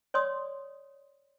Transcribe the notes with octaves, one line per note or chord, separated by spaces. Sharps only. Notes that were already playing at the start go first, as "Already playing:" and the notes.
C#5 D5 C6 D#6